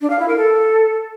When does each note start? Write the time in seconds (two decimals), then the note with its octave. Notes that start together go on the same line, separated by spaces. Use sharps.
0.01 D4
0.10 F5
0.19 E4
0.28 A#4
0.37 A4